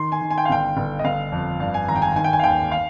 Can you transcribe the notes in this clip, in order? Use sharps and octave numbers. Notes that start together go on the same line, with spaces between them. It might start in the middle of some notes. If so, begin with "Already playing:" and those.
Already playing: D#3 C6
G#5
D#3
G#5
G5
F5
G1 G5
G1
D#5
G1 F5
F2
G2 F5
G#5
G#1 A#5
G5
G#5
D#3 G#5
G5
G#5
F5
D#2 G5
F5